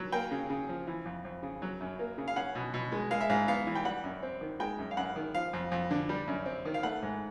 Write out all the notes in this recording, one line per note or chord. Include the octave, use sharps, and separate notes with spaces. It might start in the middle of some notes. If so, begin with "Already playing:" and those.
Already playing: F#3
A#3 G5
C#3
C#3
F3
E3
F2
F2
C#3
F#3
F#2
A#3
C#3
F5
C#4 F#5
B2
B2
G#3
G#3 F5
E5
G#2 F5
B3 F5
E3
G5
G3 F#5
F#2
C4
D#3
G#3 G5
F#2
F5
F#2 F#5
D#3
F3 F5
F2
F2
D3
G3
F#2
C4
D#3
F5
A3 F#5
G#2